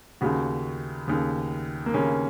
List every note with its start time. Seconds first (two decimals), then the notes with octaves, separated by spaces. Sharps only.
0.21 D#2 C#3 F#4
1.08 D#2 C#3
1.86 A#3
1.94 D#2 C#3 C#4